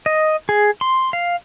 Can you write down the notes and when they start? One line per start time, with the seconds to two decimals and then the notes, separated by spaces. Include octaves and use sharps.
0.06 D#5
0.49 G#4
0.81 C6
1.13 F5